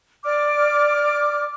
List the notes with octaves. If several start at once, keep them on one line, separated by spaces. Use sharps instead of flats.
D5 D6 F6